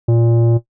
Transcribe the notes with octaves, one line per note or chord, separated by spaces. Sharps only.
A#2